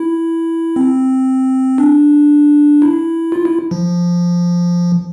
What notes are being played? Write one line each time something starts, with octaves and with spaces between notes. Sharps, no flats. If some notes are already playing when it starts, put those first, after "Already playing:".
Already playing: E4
C4
D4
E4
F4
E4
F3